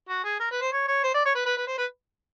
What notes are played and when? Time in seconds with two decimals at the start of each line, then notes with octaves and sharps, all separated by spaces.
0.09 F#4
0.24 G#4
0.40 A#4
0.51 B4
0.62 C5
0.72 C#5
0.88 C#5
1.04 C5
1.14 D5
1.25 C#5
1.35 B4
1.45 B4
1.57 B4
1.67 C5
1.78 B4